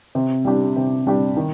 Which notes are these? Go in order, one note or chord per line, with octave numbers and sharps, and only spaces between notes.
C3
G3 D4 G4
C3
G3 D4 G4
D#3